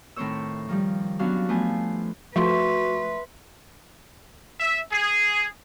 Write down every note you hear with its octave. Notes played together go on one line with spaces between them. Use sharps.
A2 D#3 C4 C5 C#5 E6
D#3 F3 G3
F#3 B3 C#4 D4 F#4 F5
F3 A3 B3 C5 G#5
F3 A3 F#4 B4 E5 C6
E5
G#4